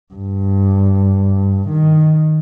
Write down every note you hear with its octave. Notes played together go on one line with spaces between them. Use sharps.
G2
D#3